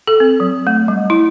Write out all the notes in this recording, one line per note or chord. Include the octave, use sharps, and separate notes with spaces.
A4
C4
F#3
A3
G3
E4